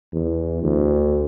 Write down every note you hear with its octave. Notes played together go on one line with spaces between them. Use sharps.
E2
D2